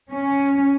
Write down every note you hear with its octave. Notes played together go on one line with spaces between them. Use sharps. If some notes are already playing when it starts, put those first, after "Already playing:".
C#4